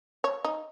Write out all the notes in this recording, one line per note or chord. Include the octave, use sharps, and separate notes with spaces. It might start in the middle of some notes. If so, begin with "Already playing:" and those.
C#5
D#4